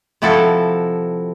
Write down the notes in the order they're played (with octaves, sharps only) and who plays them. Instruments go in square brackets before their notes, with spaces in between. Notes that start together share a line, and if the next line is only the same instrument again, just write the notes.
[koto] C3 F3 E4 F#4 A4